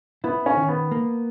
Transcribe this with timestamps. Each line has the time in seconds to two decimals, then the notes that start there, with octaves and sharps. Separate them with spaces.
0.24 B3 E4
0.46 C#4
0.57 D#3
0.68 B3
0.91 A#3